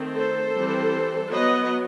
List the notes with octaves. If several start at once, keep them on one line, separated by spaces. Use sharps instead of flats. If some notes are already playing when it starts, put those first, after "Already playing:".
Already playing: D#3 A3 C4
A4 C5
E3 G3 C4
F#3 B3 B4 D#5